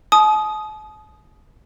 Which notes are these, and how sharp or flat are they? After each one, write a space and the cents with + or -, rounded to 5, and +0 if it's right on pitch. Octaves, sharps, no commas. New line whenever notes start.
A5 -45 D#6 +0